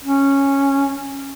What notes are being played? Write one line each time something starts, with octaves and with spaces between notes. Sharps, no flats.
C#4